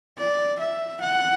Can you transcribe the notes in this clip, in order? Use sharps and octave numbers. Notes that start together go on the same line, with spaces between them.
D5
E5
F#5